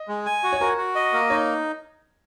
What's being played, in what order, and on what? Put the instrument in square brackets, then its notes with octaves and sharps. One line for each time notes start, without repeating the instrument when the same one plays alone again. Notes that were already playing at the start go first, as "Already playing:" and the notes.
Already playing: [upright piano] D#5
[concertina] G#3
G#5
F#4
[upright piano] C#5
[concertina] F#4 [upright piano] A#4
[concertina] F#4
D#5
A#3
[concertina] D#4 [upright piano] C#5